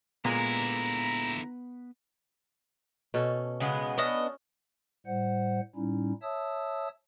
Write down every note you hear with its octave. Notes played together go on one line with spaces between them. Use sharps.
A#2 D3 G#3 A#3 B3 E4 B4 A#5
B2 C#4 A4
C#3 G#3 B3
B3 C#4 D4 D#5
A2 G3 C5 F#5
A2 G3 C#4 D#4 E4
C#5 E5 A5 D#6 E6